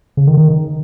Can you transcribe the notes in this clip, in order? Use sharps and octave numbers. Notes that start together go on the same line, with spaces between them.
C#3
D#3
D#3